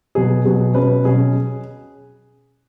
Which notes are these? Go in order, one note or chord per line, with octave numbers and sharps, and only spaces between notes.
B2 F#3 B3 G#4
B2 F#3 B3 G#4
B2 F#3 C#4 B4
B2 F#3 C#4 G#4